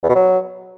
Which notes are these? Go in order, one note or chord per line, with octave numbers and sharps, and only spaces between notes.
E2
B2
F#3